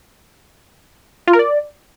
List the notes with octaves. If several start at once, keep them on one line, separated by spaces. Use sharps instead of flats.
F4
A#4
D5